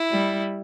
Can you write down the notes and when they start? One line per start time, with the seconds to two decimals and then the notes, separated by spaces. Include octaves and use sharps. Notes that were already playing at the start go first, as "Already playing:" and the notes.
Already playing: E4
0.11 G3